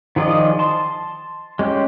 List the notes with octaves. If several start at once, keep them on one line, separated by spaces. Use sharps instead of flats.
D#3 F3 G#4 D5 D#5
A5 C6
G#3 C#4 G4